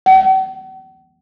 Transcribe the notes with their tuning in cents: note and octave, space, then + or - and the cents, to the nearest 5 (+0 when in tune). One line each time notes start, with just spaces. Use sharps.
F#5 +45